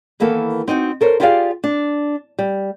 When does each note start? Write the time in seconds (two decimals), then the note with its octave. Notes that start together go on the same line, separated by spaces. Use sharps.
0.20 D#3 E3 A#3 B3 A4
0.68 C4 D#4 F4 F#4
1.01 A4 A#4 C5 C#5
1.20 E4 F4 G4 G#4 D5 F5
1.64 D4
2.39 G3